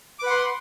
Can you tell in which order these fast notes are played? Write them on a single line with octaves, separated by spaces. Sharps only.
D6 B4 F#5 C6